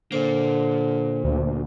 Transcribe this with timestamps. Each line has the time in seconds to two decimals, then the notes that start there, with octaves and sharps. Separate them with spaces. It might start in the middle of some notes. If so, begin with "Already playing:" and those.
0.12 A#2 D3 A#3 C5
1.24 D2